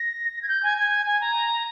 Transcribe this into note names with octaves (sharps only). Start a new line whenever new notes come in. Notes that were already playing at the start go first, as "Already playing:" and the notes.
Already playing: A#6
G#6
G6
G#5
G#5
G#5
A#5